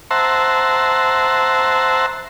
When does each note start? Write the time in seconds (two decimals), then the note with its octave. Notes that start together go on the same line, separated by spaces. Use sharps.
0.11 C5 E5 F#5 A5 A#5 C6